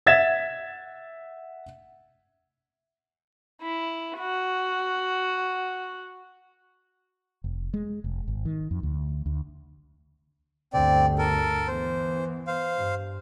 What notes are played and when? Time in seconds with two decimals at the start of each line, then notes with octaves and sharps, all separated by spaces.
0.06 E5 F#5 G#6 A6 B6 E7
3.62 E4
4.19 F#4
7.44 F1
7.74 G#3
8.04 F1
8.28 G#1
8.45 D#3
8.71 F2
8.83 D2
9.26 D2
10.74 G1 D2 C4 D5
11.18 A4 A#4
11.68 E3 B3 C5
12.47 C5 F5
12.76 G2